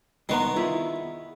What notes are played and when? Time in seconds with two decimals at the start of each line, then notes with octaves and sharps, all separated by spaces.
0.29 C2 D#3 B3 B4 A#5 C6 C#6
0.56 E4 F4 G#4 B5